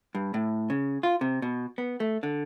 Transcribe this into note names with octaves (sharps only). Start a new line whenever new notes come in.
G2
A2
C#3
F4
C3
B2
B3
A3
D3